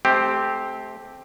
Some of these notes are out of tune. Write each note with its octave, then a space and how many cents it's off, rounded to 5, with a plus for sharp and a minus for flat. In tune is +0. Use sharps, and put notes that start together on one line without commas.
A3 -25 C4 +0 G4 +0